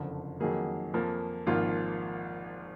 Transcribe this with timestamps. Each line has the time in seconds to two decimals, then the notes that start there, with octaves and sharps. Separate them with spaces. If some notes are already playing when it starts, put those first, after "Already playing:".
Already playing: F#1 F2 D3 F3
0.40 F2 D#3 F#3 A#3 G#4
0.94 F2 F3 A#3
1.47 G#1 G#2 F3 A#3 F4